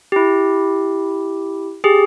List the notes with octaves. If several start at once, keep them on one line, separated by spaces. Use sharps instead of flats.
E4 G4
G4 G#4